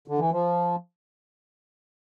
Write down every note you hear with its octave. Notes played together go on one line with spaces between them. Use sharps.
D3
E3
F3